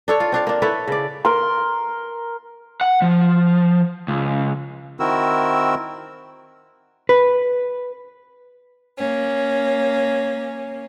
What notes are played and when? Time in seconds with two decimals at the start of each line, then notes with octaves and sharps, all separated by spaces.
0.08 D4 A4 C#5
0.20 F4
0.32 C4 D4 F5
0.47 A#3 D4
0.62 E4 A4 B4 C#5
0.88 C#3 D5
1.25 A#4 C6
2.81 F#5
3.02 F3
4.08 C#2
5.00 D#3 C4 E4 F#4 A#4 E6
7.09 B4
8.97 A#3 C#4